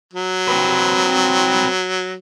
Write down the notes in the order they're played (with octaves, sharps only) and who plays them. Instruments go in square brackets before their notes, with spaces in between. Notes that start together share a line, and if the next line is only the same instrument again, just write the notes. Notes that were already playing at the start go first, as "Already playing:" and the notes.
[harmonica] F#3
[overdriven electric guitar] C4 B4